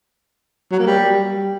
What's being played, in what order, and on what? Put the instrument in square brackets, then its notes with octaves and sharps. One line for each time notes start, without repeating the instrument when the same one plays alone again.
[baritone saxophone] F#3
A#3
G3